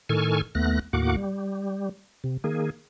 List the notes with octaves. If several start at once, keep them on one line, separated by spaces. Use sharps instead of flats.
A2 D#3 A4 G#5 C#6 F6
D#2 A3 B3 F#6 A#6
D#2 A2 A#3 F#4 F#5 D6
G3
C3
D#3 A#3 G#4